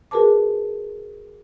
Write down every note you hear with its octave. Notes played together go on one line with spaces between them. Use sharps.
F#4 G#4 A#4 B4 A5 D6